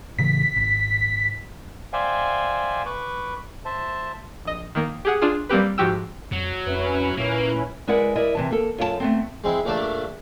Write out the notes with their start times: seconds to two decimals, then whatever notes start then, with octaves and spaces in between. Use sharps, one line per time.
0.19 A2 C#3 E3 B6
0.57 G#1
1.93 C5 D5 E5 F5 G5 G#5
2.86 B4 B5 C#6 D6
3.65 C5 E5 A5
4.45 A#1 D#5
4.75 D#3 A#3
5.05 G4 G#4 F#5
5.21 D4 F4 G#4
5.49 G3 A#3 C4 G4 B4
5.78 G#2 F3 F#4 G4 G5 E6
6.32 F2 F#3
6.66 F2 C#4 E4 B4
7.17 A#2 A#3
7.87 G#3 E4 A#4 B4 D5 F#5
8.15 E4 A#4 D5 D#5
8.35 C3 E3 A5
8.50 A#3 A4
8.78 F#2 F4 F#4 A5
9.00 A3 B3 C4
9.44 G#3 C4 E4
9.65 A#1 A3 A#3 D4 D5 A5